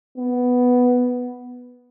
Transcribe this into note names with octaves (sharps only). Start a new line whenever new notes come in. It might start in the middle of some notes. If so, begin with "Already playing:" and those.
B3